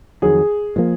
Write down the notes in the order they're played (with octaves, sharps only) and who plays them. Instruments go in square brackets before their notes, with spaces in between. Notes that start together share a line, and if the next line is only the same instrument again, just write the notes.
[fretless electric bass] F2 D#3 F#3 [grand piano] G#4
[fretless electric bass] A#2 F3 A#3